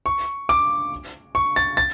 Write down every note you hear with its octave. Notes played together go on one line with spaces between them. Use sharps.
C#6
D6
C#6
A6
A6